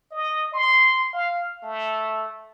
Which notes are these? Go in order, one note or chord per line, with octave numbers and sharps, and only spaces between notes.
D#5
C6
F5
A3